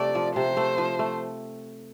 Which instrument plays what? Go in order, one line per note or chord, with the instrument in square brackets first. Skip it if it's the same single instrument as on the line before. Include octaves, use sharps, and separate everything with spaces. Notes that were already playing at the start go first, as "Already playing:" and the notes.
Already playing: [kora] C3 A3 [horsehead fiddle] D5
[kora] F3
[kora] C3 [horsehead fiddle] C5
[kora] A3
F3
A3